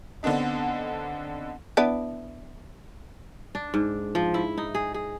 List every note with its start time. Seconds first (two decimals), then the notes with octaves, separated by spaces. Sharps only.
0.23 D3 B3 C4 D4 D#4
1.77 B3 D4 E4
3.55 D4
3.74 G#2
4.15 F3
4.34 E4
4.57 D#4
4.75 G#4
4.94 G#4